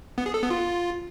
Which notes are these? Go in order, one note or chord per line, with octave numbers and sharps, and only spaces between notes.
B3
G#4
A4
B3
F4